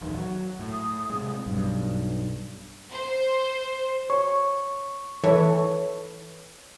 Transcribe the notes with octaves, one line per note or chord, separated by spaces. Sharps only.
A#1 E2 D#3
F#3
A2
D#6
C3 G#3
B1 G2
C5
C#5 C#6
E3 A4 B4 C#5